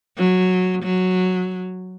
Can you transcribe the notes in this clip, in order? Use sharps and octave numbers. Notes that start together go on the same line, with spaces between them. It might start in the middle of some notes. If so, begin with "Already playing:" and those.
F#3
F#3